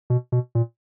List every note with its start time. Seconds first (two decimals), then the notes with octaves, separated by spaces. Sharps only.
0.10 B2
0.32 B2
0.55 A#2